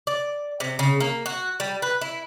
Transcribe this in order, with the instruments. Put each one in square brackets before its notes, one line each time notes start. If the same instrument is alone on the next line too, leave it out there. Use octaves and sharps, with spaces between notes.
[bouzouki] D5
C3
C#3
A#3
F#4
G3
B4
E4